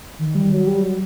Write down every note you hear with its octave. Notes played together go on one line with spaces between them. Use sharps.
D#3
G3
F#3
G3
F#3